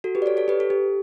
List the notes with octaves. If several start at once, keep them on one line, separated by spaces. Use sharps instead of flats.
F#4 A4
G4 B4
D5
A4 C#5
A4 C#5
G4 B4
A4
G4